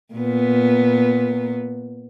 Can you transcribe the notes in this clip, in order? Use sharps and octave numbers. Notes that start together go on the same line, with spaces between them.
A#2 B3